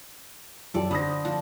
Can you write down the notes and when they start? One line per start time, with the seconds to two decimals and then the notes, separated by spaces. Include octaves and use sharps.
0.74 F#2 F4 G4 A4 D5
0.91 D3 C5 B5 D#6 A#6
1.25 F3 D4